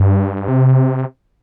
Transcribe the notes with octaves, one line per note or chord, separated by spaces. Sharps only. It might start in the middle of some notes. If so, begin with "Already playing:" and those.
Already playing: G2
C3